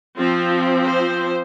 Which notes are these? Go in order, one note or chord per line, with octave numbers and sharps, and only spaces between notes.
F3 C4 F4
C5